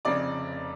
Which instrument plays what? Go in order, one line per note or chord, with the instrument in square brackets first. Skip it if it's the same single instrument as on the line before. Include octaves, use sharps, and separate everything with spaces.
[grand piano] F1 F2 C#3 D5 D6